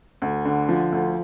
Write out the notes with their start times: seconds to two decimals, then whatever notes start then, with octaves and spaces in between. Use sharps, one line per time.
0.22 D2
0.45 D3
0.69 F3
0.92 D2